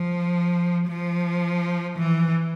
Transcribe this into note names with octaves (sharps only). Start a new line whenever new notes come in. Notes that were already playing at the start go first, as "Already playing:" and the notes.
Already playing: F3
F3
E3